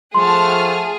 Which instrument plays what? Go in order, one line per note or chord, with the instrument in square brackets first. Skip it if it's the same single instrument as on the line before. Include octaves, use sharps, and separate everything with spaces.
[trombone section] F3 A3 [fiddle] G#4 [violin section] F#5 A5 F6 [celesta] C6